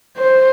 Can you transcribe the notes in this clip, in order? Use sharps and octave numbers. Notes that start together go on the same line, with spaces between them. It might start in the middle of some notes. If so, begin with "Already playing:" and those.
C5